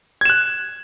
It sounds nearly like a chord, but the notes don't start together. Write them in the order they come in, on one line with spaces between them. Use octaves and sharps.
G#6 E7 F#6